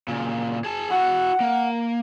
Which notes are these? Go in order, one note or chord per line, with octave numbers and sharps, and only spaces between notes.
A#2 C#3
G#4 A5
E4 F#4 F#5
A#3